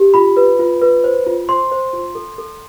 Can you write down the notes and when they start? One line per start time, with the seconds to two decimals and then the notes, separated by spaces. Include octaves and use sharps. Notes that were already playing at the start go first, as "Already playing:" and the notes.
Already playing: G4
0.14 F4 B5
0.37 B4
0.59 F4
0.82 B4
1.04 C5
1.26 F4
1.49 C5 C6
1.72 C5
1.93 F4
2.15 A4
2.38 A4